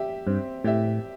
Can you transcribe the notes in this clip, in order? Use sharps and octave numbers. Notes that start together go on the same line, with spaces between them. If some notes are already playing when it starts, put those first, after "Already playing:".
Already playing: G4 E5
G2 C4
A2 G4 E5